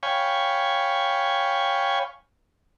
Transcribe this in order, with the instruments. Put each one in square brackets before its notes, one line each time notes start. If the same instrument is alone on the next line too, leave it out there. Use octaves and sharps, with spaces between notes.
[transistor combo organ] C#5 F5 G5 G#5 B5 C#6